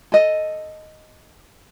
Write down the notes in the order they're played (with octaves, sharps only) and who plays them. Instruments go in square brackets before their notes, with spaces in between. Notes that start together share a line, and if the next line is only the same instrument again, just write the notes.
[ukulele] A4 D#5